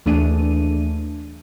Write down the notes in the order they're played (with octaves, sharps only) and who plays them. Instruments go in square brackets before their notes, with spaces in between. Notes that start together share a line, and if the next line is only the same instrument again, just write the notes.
[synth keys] D#2 E3 A3 D4 G#4 D#7